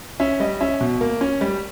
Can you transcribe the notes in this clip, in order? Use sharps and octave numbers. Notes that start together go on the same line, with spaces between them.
C#4 E5
G3 D#5
C#4 E5
B2
A#3
C#4
G3